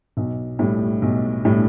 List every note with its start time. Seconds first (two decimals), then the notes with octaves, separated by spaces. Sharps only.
0.17 B1
0.59 A2 G3
1.02 B1
1.45 A2 G3